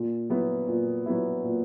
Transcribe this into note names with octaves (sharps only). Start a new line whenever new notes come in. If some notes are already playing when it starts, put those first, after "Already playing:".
Already playing: A#2
F#3 B3 E4
A#2
F#3 B3 E4
A#2